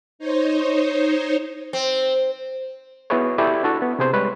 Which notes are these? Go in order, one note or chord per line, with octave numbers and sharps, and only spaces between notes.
D#4 C5 C#5
C4
B3 E4 F#4 G#4 B4 C#5
E4 G4 A4 D5 E5
D4 F#4 A4
B3
C3 G#4 C5
G3 G#3 B4 C#5